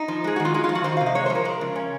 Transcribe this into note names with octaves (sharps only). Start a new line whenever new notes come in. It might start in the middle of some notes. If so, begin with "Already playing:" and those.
Already playing: D#4
F3
G#3 G#4
D#3 F#4
F4
G#3 D#4
F4
F3
F#4
D#3 C5
C3 F5
D#5
G#3 C#5
C5
F3
A#4
G#3
C#3
C#4